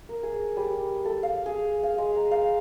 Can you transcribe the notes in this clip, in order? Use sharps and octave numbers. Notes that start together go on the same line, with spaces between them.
A#4
G#4
G3
A4
F5
G#4
F5
G#3
A#5
F5